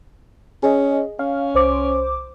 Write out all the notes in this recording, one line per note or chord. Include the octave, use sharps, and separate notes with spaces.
C#4 G#4 D#5
C#4 F5
C2 C5 D6